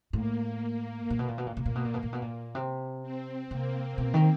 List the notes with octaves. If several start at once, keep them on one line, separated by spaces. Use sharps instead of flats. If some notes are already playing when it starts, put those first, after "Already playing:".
A2 A#3
A#2
B2
A#2
B2
A#2
B2 A#3
A#2
B2
A#2
B2
A#2
B2
A#2
C3
C4
C3 A#3
B2
D#3